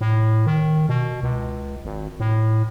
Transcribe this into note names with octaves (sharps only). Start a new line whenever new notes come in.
A2
D#3
B2
C#2
G#1
A2